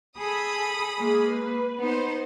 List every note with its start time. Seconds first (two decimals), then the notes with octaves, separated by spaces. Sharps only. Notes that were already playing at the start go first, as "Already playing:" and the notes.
0.18 G#4 A4 B5 D#6
0.99 G#3 A#3 G#4
1.30 B4
1.80 B3 D#4 C5